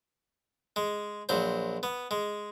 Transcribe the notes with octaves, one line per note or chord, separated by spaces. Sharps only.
G#3
A#1 F#3 C5
B3
G#3